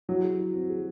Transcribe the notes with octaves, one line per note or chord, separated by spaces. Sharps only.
F#3 E4
G#4
E4
C4
G#4